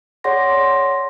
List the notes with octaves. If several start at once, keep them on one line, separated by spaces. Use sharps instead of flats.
G#4 C#5 D5 F#5 C6 A#6